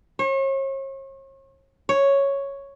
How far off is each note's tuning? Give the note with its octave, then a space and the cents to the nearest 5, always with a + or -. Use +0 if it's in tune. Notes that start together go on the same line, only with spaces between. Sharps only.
C#5 -40
C#5 +0